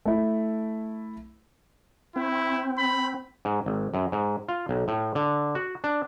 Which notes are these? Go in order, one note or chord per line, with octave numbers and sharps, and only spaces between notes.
A3 E4
C4 E4
B5
G#2
G#1
F#2
G#2
F4
B1
A2
D3
F#4
D4